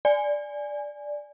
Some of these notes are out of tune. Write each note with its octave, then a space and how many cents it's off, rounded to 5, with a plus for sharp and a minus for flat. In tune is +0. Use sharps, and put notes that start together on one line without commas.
D5 +0 G#5 +0